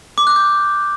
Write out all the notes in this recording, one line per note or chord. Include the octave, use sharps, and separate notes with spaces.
D6
F#6
G6